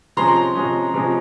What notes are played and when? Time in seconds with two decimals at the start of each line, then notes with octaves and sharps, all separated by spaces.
0.17 C3 F3 G#3 C#4 A#5 C6
0.55 C3 F3 G#3 C#4
0.94 C3 F3 G#3 C#4